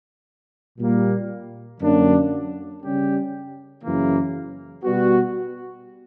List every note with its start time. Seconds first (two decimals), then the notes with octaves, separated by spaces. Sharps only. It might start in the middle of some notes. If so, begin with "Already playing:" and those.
0.79 A#2 G3 A#3
1.81 F#2 D3 F#3 A#3 D4
2.82 C#3 G3 C#4 G4
3.83 F#2 C#3 E3 A#3
4.84 B2 G3 B3 F#4